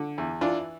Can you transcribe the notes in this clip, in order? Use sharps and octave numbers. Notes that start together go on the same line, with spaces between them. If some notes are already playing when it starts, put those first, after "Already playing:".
Already playing: D3
E2
E3 D4 F4